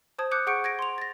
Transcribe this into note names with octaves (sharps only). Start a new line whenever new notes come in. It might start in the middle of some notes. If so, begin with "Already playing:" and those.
C5 A5 D#6 G#6
D6 D#6 F#6 G6 C#7
G#4 F#5 C#6 G6 C#7 D7
G#6 A#6 D7
C6 F7
A6 A#6